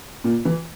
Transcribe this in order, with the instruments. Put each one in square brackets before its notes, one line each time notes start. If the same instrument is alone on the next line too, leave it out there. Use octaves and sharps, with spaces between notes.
[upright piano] A#2
E3